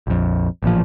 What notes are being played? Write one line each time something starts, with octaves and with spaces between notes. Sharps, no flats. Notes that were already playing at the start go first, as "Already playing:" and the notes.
A#1 F2
A1 A#2 F3